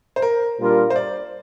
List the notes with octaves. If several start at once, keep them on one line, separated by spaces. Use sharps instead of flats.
C5
A#4
A#2 G3 D4 F4 A#4
C5
D5